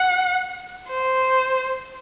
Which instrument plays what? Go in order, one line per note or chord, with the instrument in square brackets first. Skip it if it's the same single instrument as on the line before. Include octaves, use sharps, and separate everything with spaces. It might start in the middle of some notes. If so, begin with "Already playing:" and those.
Already playing: [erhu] F#5
C5